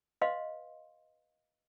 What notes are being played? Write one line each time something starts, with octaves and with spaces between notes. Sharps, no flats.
B4 D#5 F5 C6